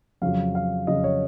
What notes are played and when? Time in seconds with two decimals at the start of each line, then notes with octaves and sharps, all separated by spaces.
0.22 F2 C#3 F#3 F5
0.55 F5
0.87 F2 C#3 F#3 D#5
1.04 C#5